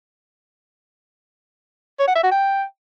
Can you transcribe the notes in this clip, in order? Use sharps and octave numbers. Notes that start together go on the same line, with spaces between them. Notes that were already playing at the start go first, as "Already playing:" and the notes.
C#5
F#5
E5
F#4
G5